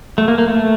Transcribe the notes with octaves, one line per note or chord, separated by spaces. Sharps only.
A3
A#3
A#3
A3